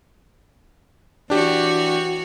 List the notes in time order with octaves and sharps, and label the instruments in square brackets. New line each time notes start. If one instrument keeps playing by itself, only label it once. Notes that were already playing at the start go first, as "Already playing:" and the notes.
[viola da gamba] E3 F#4 C#5 [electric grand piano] D4 G4